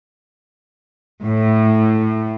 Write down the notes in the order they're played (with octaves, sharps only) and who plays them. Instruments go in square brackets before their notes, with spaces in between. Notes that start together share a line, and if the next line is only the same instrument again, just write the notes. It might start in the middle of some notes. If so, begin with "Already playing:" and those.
[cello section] A2